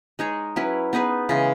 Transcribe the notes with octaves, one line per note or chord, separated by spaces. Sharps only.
G#3 D#4 G#4 C#5
F#3 C#4 E4 B4
B3 D#4 G#4 B4
C#3 E3 G#3